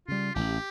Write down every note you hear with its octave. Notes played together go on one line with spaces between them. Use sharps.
C#3 G3 F4
A1 G4